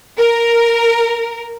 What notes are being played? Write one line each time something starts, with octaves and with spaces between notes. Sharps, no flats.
A#4